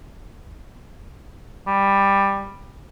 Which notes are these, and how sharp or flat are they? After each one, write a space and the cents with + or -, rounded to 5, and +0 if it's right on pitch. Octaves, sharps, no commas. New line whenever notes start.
G3 +10